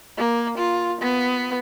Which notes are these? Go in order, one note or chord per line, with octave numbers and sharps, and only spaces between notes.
A#3
F4
B3